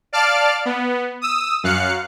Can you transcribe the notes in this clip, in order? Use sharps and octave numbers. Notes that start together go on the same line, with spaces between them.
D5 F5 A5 F6 D7
B3
D#6 E6
F#2 F5 F#6 C#7